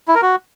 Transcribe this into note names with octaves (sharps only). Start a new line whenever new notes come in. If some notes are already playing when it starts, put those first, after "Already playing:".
E4
A#4
F#4